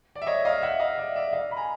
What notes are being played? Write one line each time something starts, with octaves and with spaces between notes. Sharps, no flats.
D5
E5
C#5 D#5
D#5 F5
E5 F#5
D#5 F5
D5 E5
D5 E5
D#5 F5
B5
G#5 A#5